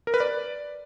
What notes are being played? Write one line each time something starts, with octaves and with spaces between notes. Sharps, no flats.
A#4
B4
D5